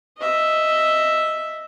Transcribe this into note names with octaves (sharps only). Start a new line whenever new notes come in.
D#5 E5